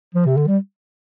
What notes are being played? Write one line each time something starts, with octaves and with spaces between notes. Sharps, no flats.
F3
C3
D3
G3